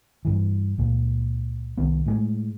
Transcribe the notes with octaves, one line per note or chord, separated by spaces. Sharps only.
G2 E3
C#2 A#2
C2 D#3 B3
A2 D#3 G#3